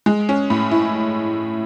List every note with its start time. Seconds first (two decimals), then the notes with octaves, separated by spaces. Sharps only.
0.06 G#3
0.29 C#4
0.50 A2
0.71 E4